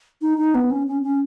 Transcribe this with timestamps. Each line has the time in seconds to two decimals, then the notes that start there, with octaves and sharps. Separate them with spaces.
0.22 D#4
0.38 D#4
0.55 B3
0.71 C#4
0.87 C#4
1.03 C#4